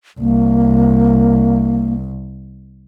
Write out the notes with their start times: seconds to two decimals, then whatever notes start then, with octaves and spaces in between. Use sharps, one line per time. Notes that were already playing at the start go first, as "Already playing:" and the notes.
0.20 C2 A#3